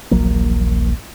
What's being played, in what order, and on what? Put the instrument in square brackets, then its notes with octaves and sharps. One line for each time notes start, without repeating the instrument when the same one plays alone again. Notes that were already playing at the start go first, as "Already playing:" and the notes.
[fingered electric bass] D#1 A#1 F#3 A#3